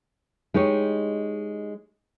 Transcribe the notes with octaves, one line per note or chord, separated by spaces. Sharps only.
G#3 D#4 G4 C#5